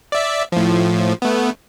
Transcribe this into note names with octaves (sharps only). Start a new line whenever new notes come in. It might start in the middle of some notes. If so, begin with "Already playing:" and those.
D5 E5
A2 F3
A3 B3